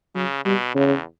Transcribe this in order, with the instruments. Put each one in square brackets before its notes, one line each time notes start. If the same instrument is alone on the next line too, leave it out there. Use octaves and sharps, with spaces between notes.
[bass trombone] C#3 [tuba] F#3
[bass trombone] B2 [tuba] G3
[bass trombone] E2 [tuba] C#3